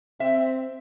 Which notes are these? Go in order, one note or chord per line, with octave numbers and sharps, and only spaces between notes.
C4 E5